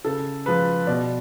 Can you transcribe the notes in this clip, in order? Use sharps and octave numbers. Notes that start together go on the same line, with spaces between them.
C#3 A4
F3 G#3 B4
B2 D5